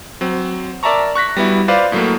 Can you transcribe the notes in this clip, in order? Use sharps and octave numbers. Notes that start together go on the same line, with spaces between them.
F#3 C4
A#4 D5 E5 A5 A#5 C#6
C#6 F#6 A#6 B6
G3 B3 E4 F#4
F4 B4 C5 D5 F5
A2 F#3 A3 A#3